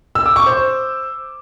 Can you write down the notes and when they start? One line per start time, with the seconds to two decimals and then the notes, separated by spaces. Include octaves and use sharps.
0.15 E6
0.26 D6
0.36 C#6
0.46 C5